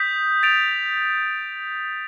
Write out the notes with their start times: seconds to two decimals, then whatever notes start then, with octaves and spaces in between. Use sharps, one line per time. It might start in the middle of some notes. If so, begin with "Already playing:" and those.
Already playing: D#6 G6 B6
0.43 A6 D7 F7